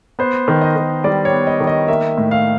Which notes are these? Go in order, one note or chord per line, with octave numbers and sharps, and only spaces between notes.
B3 C5
D#3
D#5
D#3
G3 D5
C#5
B3
D#5
D#3
D#5
A#3 E5
A2
F5